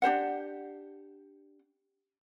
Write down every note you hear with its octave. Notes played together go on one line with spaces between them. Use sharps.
D4 G4 C5 F#5